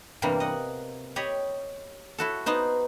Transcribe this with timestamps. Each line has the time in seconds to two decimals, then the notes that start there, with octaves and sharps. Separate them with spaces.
0.22 E2 G2 C3 G3 A#3
0.40 D#5 F#5
1.16 G4 C#5 D#5 B5
2.18 E4 F#4 A4
2.46 B3 D#4 C5